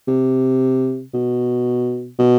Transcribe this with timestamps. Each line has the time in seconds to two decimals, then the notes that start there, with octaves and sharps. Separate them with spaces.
0.08 C3
1.14 B2
2.19 B2